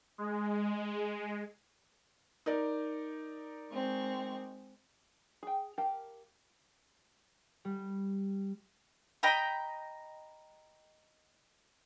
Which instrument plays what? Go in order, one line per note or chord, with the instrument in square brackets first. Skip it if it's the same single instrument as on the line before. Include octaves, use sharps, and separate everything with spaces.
[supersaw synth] G#3
[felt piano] D#4 A#4 D5
[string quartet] G#3 C4 C#6
[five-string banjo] G#4 G5
G4 A#4 F5 G5 A5
[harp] G3
[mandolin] D#5 G5 A#5 B5